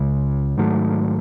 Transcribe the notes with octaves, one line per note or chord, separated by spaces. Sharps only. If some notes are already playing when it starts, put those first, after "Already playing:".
Already playing: C#2 C#3 G#3
G#2 D#3 F#3 A3